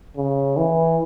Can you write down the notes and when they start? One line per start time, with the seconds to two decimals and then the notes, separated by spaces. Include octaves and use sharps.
0.17 C#3
0.57 E3